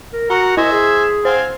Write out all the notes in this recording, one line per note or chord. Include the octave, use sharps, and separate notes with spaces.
A#4
F#4 A#4 F#5 A#5
E4 C5 D#5 E5 G#5
G#4
C4 C5 F5 G#5